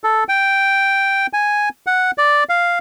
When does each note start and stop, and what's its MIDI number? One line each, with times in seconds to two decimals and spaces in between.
0.04 0.24 69
0.29 1.27 79
1.33 1.69 80
1.87 2.11 78
2.18 2.44 74
2.49 2.79 77